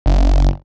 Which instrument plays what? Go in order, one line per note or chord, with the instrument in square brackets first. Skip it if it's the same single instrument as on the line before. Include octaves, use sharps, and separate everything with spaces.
[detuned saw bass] F#1